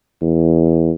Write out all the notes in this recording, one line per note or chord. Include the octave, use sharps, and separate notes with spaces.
E2